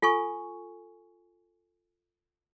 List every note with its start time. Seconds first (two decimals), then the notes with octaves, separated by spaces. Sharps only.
0.02 F4 A4 G#5 C#6